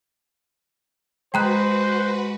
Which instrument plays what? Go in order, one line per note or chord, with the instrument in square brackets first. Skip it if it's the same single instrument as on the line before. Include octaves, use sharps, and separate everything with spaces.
[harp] G#3 B5 [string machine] F#4 B4 [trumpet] C5 [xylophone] G5 A#5 F#6